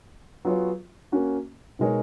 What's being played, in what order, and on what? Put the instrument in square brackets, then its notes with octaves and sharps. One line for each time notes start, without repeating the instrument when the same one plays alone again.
[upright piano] F#3 B3 F4 G#4 C#5
A#3 C#4 F#4
B2 G#3 D#4 A#4 C#5